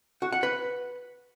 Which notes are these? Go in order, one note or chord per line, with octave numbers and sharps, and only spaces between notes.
F#4
F#5
B4